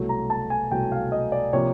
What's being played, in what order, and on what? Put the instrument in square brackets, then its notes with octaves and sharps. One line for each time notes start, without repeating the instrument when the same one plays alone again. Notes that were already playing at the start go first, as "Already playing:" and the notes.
Already playing: [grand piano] C2 B2 F#3 A3
A#5
A5
G#5
C2 B2 F#3 A3 G5
F5
D#5
D5
C3 F3 A#3 C#5